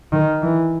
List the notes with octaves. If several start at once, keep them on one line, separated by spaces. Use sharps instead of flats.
D#3
E3